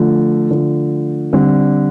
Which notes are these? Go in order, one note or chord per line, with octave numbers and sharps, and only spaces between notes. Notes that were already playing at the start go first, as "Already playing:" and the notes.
Already playing: D3 F3 A3
D3 F3 A3
D3 G3 C4